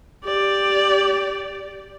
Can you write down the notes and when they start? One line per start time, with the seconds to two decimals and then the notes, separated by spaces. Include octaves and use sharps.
0.25 G4 D5